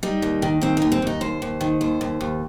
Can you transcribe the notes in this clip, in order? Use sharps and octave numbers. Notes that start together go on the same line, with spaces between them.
G3 D#4
D#2
D#3
D#2 C4
D#2 D#4
C4
D#2 D#4
D#2 C5
D#2
D#3
D#2 C5
D#2
D#2